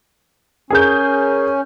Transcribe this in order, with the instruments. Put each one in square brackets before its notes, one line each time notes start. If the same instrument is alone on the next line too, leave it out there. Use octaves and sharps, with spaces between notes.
[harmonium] C#4 [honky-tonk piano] G#4 A#4 G6